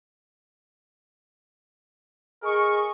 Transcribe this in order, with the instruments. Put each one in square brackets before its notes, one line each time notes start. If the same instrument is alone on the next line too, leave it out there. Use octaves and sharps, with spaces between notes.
[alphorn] G#4 [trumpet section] A#4 D#5 C#6